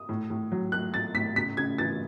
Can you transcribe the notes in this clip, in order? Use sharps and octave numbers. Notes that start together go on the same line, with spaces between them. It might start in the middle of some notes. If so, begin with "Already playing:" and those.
Already playing: D#6
A2
A2
F#3
A3 F#6
A2 A6
A2 B6
C#3 B6
C#3 G#6
E3 A6